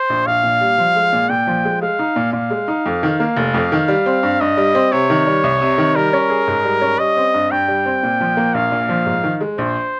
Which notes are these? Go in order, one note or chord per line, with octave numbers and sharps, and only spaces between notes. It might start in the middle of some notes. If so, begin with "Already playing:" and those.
Already playing: C5
A#1
A#1 F5
A#2
G3
F3
G#3
A#2
A#2 G5
F3
G#3
G#3 F5
D#4
A#2
A#2 F5
G#3
D#4
F2
D#3
A#3
F1
F2
D#3
G3
C4
G2
G2 D#5
G3
C4
C3 C#5
D#3
G3
C2
C3
D#3
G3 A#4
C#4
G#4
G#2
G3
C#4
G3 D#5
C4
G2
G2 G5
G3
C4
A#2
F3
A#3
A#1 F5
A#2
F3
G#2
D#3
G#3
A#1 C5